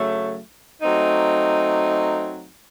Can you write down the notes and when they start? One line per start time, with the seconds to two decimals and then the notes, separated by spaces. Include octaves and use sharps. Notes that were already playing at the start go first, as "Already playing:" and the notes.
Already playing: C#3 F#3 A3
0.82 F#3 A3 C4 D#4